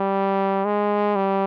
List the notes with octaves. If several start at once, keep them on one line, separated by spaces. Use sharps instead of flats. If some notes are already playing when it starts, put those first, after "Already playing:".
Already playing: G3
G#3
G3